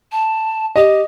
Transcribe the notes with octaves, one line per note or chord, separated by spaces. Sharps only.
A5
G4 D#5